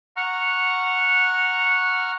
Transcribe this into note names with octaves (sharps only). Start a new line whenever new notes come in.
F#5 A#5 C#6 F6